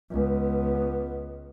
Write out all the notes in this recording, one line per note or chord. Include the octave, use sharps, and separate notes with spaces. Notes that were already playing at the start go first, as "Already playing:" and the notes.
C#2 B3